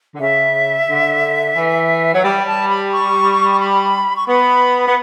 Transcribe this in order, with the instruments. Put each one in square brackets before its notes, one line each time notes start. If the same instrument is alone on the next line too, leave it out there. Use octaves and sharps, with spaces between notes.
[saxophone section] D3
[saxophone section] C#3 [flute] E5
[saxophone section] D3
E3
[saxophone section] F#3 [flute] F#5
[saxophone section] G3 [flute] G5
[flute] A5
B5
C#6
B5
C#6
[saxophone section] B3 [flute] B5
[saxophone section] B3